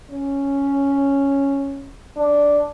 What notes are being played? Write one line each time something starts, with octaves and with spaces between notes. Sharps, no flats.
C#4
D4